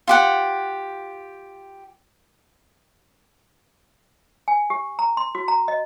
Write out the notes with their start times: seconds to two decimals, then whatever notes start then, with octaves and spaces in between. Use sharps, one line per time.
0.07 F4 G4 F#5
4.48 G#5
4.70 G4
4.99 A#5
5.17 C6
5.35 F#4
5.48 A#5
5.68 D#5